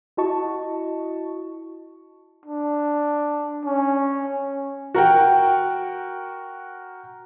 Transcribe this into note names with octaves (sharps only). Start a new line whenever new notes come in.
E4 F#4 D#5 A5 C#6
D4
C#4
F#4 A#4 F#5 G5